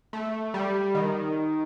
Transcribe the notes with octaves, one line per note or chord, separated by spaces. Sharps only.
A3
G3
D#3